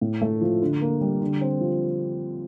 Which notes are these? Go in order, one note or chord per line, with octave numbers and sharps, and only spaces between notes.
A2
A3
F3
D3
A#3
G3
D3
C4
F3